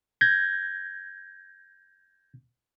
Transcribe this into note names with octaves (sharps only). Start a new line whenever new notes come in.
G6 G#6 A#6